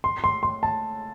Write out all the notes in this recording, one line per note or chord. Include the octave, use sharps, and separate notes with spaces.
C6
C6
C6
A5